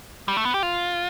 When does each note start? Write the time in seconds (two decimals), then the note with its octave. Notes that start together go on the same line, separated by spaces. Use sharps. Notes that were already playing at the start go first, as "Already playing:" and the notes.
0.28 G3
0.37 A3
0.45 B3
0.54 G4
0.63 F4